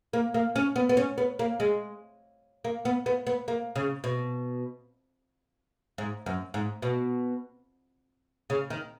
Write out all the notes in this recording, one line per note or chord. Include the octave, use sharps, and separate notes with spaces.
A#3
A#3
C#4
B3
B3
C#4
B3
A#3
G#3
A#3
B3
B3
B3
A#3
C#3
B2
G#2
F#2
G#2
B2
C#3
D#3